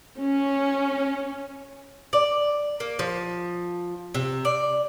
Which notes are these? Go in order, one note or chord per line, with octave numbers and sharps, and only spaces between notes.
C#4
D5
A#3
F3
C3
D5